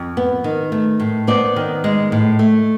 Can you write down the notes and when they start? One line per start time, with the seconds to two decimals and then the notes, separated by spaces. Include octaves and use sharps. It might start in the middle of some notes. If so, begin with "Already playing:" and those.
Already playing: F2
0.17 B3
0.44 D#3
0.72 A3
1.00 A2
1.27 B3 C5 D5
1.56 D#3
1.84 G#3
2.12 A2
2.39 A3